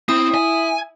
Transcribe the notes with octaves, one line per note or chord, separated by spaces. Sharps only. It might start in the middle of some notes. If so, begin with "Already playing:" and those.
C4 E4 D#6
G#5